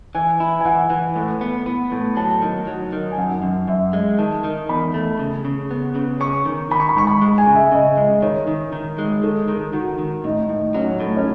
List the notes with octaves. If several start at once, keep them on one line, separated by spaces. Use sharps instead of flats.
E3 G#5
E4
G#5
E3 F#5
E3
A2
B3
B3
A2
F#3 A5
D#3
F#3
D#3
G#5
F#2 F#5
F#2
F#2 E5
G#3
D#3 A5
D#3
E2 B5
A3
C#3
C#3
B3
C#3
C#4 C#6
D#3
D#3 B5
C#6
B5
G#2 C#6
B5
G#3
G#5
C#3
E5
C#3 D#5
G#3
D#3 C#5
D#3
D#3
G#3
D#3 A4
D#3
D#3 F#4
D#3
A2 D#4
A2
F#3 C#4
A2
C#4